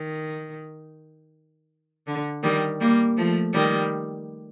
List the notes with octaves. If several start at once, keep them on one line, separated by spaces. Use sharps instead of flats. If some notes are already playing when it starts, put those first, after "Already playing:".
Already playing: D#3
D3
D#3 G3
G3 A#3
F3 A3
D#3 G3